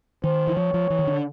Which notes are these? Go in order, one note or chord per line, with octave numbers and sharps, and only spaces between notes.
D#3 C5
E3
F3 C#5
F3
E3
D#3
D3